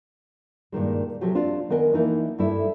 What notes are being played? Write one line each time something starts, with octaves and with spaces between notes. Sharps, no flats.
G2 A#2 D#3 G#3
C3 F3 F#3 A3 G4
C4 D4 F4
D#3 B3 A#4 D#5 G#5
E3 F3 A#3 D#4 E4
G2 A3 E4